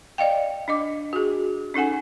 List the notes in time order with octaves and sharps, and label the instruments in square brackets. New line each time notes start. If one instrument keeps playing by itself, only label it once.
[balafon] D5 D#5 F5 G5
D4 D#5 D6
F#4 G#4
C#4 D#4 A4 F#5 G#5